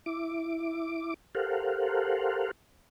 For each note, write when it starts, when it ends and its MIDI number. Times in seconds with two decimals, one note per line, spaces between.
0.06 1.14 64
0.06 1.14 86
1.35 2.51 67
1.35 2.51 69
1.35 2.51 70
1.35 2.51 72
1.35 2.51 77
1.35 2.51 78